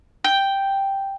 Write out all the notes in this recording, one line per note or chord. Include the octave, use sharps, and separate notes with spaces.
G5